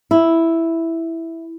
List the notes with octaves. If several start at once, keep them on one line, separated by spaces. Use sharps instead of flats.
E4